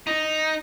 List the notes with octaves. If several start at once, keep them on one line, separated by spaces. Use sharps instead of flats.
D#4